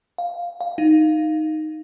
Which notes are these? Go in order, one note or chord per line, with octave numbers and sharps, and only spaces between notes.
F5
F5
D#4